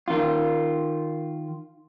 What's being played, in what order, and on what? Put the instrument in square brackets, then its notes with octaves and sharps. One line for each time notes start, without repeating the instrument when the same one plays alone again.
[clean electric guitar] D#3 F4